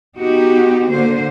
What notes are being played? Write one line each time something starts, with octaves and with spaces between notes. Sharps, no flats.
B3 D#4 F#4 G4
D3 A#3 C5